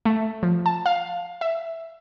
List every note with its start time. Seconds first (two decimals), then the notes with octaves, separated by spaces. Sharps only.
0.05 A3
0.43 F3
0.66 A5
0.86 F5
1.41 E5